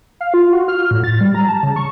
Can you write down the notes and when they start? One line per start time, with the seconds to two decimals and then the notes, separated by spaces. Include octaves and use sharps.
0.20 F5
0.34 F4
0.53 F#4
0.68 F6
0.91 A2
1.04 A6
1.21 G3
1.34 A#5
1.48 A5
1.63 C#3
1.76 C#6